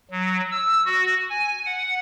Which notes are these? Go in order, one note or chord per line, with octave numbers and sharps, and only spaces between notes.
F#3
E6
F#4
G#5
F#5